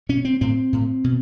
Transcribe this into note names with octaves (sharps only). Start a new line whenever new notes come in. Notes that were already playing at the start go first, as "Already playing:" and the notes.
B2 C#4
C4
A2 C4
A2
B2